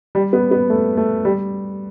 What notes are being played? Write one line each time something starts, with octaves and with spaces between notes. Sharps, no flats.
G3
B3
B3
A3
A3
G3